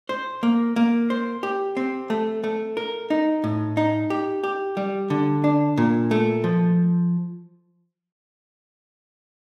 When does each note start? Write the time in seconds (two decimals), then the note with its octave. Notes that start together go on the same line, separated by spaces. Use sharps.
0.09 C5
0.43 A#3
0.76 A#3
1.10 C5
1.43 G4
1.77 C4
2.10 A3
2.44 A3
2.77 A#4
3.10 D#4
3.44 A2
3.77 D#4
4.10 G4
4.44 G4
4.77 G3
5.10 D3
5.44 D4
5.77 A#2
6.11 A3
6.44 F3